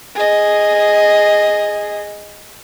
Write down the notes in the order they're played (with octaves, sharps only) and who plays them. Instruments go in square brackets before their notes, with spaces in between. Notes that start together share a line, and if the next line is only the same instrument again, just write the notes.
[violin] G#4 D#5